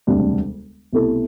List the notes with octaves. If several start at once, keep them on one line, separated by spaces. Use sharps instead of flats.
E1 D2 C3 G3 D4
C2 B2 A3 E4 A4